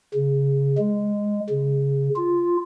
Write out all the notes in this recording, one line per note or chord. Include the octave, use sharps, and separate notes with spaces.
C#3
G#3
C#3
F4